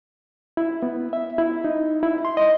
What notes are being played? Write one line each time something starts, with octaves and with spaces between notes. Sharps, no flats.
E4
B3
E5
E4
D#4
E4
C6
D#5